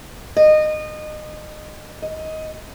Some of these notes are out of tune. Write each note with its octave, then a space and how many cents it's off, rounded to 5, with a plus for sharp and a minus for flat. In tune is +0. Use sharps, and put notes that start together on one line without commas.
D#5 -25
D#5 +15